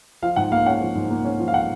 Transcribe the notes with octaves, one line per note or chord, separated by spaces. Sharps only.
F3 F5
G#2 F#5
A#3 F5
C#4 F#5
F3
G#2
A#3
C#4
F3
F5
F#5